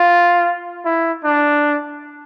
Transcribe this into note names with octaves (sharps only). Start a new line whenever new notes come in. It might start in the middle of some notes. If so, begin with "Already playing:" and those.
Already playing: F4
E4
D4